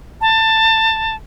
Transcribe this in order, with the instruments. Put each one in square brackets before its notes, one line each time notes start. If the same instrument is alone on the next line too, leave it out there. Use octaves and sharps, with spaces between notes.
[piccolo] A5